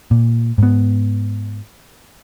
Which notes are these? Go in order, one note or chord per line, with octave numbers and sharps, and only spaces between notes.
A#2
G#2 B3